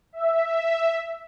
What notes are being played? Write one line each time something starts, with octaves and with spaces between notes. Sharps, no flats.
E5